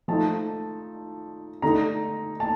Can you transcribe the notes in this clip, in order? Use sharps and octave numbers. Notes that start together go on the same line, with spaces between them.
F3 A3 D#4 A5
D3 A3 D#4 A#5
A5